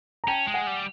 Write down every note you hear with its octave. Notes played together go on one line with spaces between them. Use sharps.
A#5
C#4 G5 A5
G#3
F#5 G#5
G3